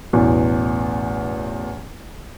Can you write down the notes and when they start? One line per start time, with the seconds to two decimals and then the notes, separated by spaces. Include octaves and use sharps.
0.13 A1 E2 B2